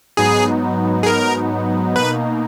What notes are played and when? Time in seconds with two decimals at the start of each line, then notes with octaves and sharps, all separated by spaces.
0.17 G#2 F#3 B3 D#4 G#4
1.03 G#4
1.06 A#4
1.96 B2 A#3 D#4 B4